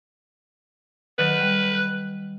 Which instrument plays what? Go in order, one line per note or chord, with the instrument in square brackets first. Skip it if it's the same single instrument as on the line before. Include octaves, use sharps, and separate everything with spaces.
[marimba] D#3 F#3 [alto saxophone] B4
[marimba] G3